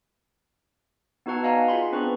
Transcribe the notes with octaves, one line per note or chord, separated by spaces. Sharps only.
B3 D#4 F#4 B4 F#5 A5
D5 D#5 F5 F#5 G#5 A#5
F4 G#4 F#5 B5 C6
B3 C4 D4 B4 B5 C#6